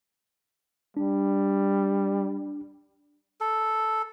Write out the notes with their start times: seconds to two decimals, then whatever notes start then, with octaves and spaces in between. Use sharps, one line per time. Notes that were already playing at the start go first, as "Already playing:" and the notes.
0.97 G3 D4
3.41 A4